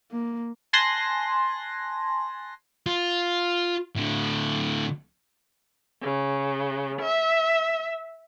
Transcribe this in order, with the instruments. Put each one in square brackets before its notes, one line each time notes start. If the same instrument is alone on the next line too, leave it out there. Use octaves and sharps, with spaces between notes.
[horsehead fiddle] A#3
[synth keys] G#5 A5 C6 F#6 A#6
[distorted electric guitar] F4
A2 D3
[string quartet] C#3
E5